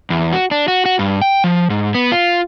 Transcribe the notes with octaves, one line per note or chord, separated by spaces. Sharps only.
E2
F#4
D4
F#4
F#4
G2
G5
F3
G#2
B3
F4